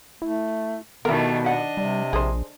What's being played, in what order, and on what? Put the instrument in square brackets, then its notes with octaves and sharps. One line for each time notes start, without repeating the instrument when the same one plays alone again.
[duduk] A3 [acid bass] E4
[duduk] B2 [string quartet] D#3 G3 A3 [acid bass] B3 [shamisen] E4 A#4
[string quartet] D4 D#5 [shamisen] F#5
[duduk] C3 [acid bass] G3
[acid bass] A#1 [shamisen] G#4 C5